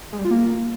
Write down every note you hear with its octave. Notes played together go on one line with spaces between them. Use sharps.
G#3
G3
F4
A#3